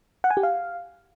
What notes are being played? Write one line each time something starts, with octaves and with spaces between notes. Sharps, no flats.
F#5
G#5
G4
F5